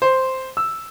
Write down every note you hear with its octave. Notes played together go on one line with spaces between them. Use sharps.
C5
E6